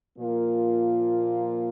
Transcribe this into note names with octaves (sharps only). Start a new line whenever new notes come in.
A#2 F3 A#3 F4 A#4